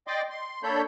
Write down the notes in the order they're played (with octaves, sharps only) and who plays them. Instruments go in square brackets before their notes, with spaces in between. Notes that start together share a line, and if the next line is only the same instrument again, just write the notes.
[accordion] D5 D#5 G5 C6 D6
C6
A#3 D4 A4 C#5 B5 G6